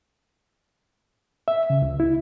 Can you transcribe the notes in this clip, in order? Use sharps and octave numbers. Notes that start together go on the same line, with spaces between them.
E5
C#3
C#2
E4